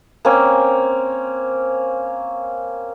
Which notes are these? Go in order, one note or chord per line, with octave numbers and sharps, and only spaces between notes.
A#3 C4 C#4 G#5